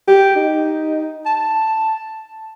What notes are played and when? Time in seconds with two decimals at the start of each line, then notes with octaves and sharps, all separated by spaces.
0.08 G4
0.36 D#4
1.26 A5